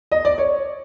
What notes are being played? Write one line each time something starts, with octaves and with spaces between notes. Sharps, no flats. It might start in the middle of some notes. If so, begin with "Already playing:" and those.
D#5
D5
C#5